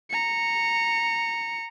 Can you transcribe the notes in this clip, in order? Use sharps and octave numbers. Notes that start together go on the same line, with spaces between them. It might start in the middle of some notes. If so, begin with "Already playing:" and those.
A#5 C#7